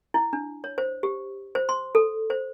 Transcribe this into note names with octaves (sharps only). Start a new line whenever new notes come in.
E4
D4
C#5
C5
G4
C5
C6
A4
C5